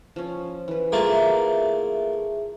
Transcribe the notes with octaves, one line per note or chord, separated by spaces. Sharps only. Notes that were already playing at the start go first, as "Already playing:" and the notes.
F3 C#4
E3 B4
A3 A#3 F4 G#4 E5